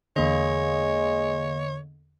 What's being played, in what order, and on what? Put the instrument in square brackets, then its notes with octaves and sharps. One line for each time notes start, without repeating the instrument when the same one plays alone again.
[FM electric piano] E2 D3 [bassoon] G#3 [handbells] A#3 D#5 [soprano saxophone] C#5